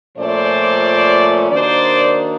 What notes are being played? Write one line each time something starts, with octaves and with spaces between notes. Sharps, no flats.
A#2 F3 A3 C#4 C5 D5
D#3 F#3 A#3 D4 C5 D5